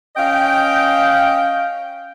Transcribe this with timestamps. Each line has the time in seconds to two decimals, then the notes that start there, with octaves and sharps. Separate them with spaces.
0.16 C#4 D#5 F5 G5